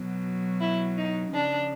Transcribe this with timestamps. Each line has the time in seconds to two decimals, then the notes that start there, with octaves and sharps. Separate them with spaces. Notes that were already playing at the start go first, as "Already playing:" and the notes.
Already playing: B2 F#3
0.60 E4
0.97 D#4
1.34 C#3 F3 D4